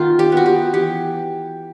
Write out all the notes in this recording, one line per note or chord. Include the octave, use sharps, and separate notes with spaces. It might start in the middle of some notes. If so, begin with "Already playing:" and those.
Already playing: D#3 B3 F4
G4
B3 F#4
G4
E3 G4